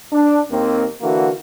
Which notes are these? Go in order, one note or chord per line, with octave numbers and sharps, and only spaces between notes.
D4
D#2 A#3 C4
D3 E3 A#3 F#4